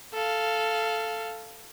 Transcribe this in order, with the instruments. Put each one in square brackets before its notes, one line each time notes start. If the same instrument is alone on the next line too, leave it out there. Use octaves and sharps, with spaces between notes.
[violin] A4 F5